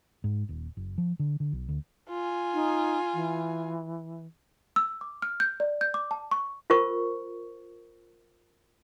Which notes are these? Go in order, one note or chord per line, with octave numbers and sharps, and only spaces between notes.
G#2
D#1
F#1
F3
D3
D3
B1
D2
F4 G#5
D#4
E3
E6
D6
F6
G6
D5
G6
D6
A5
C#6
F4 A#4 C5 C#6